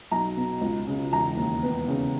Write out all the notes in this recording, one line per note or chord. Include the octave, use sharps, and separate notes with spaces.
B1 A#5
B2
C#2
C#3
E1 A#5
D#2
B3
C#3